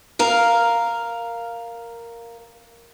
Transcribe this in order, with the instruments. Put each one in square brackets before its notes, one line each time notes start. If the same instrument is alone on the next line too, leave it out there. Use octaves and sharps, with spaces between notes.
[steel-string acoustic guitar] A#4 F5